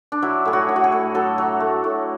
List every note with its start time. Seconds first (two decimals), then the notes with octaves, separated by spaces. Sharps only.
0.12 D4
0.22 F#3 E4
0.45 A2 G#4
0.53 F#4
0.69 A2
0.76 F#4
0.84 G#4
0.92 A2
1.15 F#3 A4
1.38 F#3
1.60 A3
1.84 A2